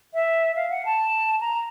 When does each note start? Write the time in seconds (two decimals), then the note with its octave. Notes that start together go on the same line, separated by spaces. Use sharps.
0.14 E5
0.56 F5
0.70 F#5
0.85 A5
1.41 A#5